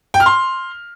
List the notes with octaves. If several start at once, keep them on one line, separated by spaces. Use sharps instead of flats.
G5
F6
C6